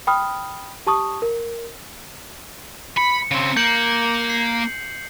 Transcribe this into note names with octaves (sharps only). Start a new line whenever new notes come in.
G5 B5 D#6 F6
G4 A5 C#6 D#6
A#4
B5 C#7
C#3 C4
A#3 G6 C#7 F#7
C7